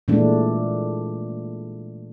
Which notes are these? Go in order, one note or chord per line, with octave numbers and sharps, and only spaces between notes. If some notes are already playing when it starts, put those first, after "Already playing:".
A#2 E3 G#3 A3 D4